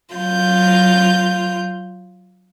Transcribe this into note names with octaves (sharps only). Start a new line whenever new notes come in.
F#3 F4 G6